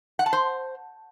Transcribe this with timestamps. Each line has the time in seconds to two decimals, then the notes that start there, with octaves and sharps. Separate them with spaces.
0.19 F#5
0.26 A5
0.33 C5